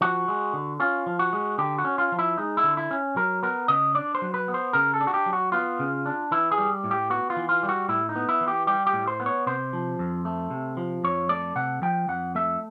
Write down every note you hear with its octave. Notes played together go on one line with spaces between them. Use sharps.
F3 F#4
G#3
D3
C#4 F4
F3
F#4
G#3
D3 G4
F#4
C#4
F4
F3
E4
G#3 D#4
E4
D3
E4
C#4
F#3 A#4
B3 A#4
C#3 D#5
D4 D5
C5
F#3
B4
B3
C5
C#3 A#4
A4
D4
F#4
G4
F#3
F#4
B3 F4
C#3
D4
E3 E4
G#4
G3
A2
G4
B3 F#4
F4
E3
F4
G3
F#4
A2 E4
D#4
B3
E4
E3
G4
G3 G4
G4
A2
C5
B3
C#5
C3 C5
F3
F2
A3
C3
F3
F2 C#5
A3 D5
C3 F#5
F3 G5
F2 F#5
A3 E5